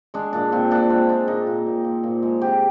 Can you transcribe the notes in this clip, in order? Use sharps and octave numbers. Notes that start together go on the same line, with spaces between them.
G#3 D4
A#2 D4
A#2 C4
A#2 D4
G#3 C4
G#3 D4
A#2 D#4
A#2
A#2
A#2
A#2
G#3
C3 G4